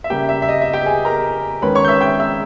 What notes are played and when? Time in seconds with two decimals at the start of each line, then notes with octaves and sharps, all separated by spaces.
0.04 E5
0.10 C#3 G3 A#3 G4 G5
0.29 E5
0.42 E5
0.49 D#5
0.62 E5
0.73 G4 G5
0.86 G#4 G#5
1.05 A#4 A#5
1.62 D#3 G#3 C#4 B4 B5
1.75 C#5 C#6
1.85 G6
1.88 E5 E6
2.01 G5 G6
2.20 E5 E6